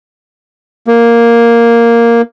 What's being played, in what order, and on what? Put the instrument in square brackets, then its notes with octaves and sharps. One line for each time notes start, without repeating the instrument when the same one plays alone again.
[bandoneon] A#3